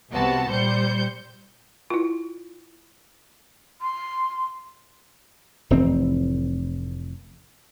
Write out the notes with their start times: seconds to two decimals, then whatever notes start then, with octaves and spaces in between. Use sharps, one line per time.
0.12 C2 C3 B3 F#4 A5
0.49 A#2 G3 C5 G6 C#7
1.90 E4 F4
3.81 C6
5.70 F1 A2 E3 C4